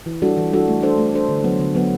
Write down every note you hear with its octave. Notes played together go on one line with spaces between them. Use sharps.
E3
G3 D4 F#4 A4
E3
G3 D4 F#4 A4
A3
D4 A4 C5
A3
D4 A4 C5
D3
F#3 B3
D3
F#3 B3